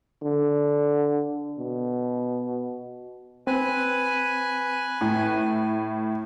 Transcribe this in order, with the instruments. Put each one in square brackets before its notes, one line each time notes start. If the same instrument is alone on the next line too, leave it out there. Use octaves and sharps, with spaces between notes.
[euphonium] D3
B2
[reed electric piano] C4 [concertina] B4 G#5
[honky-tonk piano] A2